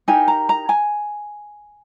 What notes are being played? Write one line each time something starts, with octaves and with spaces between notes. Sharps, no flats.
D#4 G4 A#4 G#5
A#5
A#5
G#5